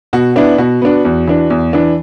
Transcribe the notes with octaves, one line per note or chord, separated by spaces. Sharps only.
B2 F#4
B3 D4 E4
B2 F#4
B3 D4
E2
E3 D4
E2
E3 D4